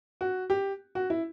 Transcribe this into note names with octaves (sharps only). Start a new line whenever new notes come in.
F#4
G4
F#4
E4